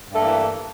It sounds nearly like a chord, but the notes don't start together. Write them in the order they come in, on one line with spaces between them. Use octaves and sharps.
G2 A3 A#3 E3